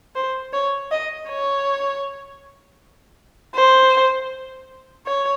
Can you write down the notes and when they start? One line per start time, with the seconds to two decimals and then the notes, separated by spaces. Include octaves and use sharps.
0.16 C5
0.53 C#5
0.91 D#5
1.29 C#5
3.55 C5
5.06 C#5